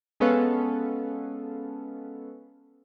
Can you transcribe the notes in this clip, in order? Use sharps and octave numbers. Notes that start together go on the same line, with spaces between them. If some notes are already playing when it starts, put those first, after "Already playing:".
G#3 B3 C#4 A4 B4 F5